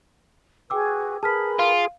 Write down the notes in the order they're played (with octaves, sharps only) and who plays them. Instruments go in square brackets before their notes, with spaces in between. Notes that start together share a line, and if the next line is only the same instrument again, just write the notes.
[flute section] F#4 G#4 B4 [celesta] G5 D6 E6
[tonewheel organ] G#4 [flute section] A#4 B4 B5 [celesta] A5 F6 B6
[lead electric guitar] F4 [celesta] F5